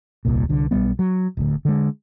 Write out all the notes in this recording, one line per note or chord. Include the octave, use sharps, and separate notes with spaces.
D#1 C2 A#2
C2 D3
B1 E2 G3 B3
F#3
D1 D2
D3 G#3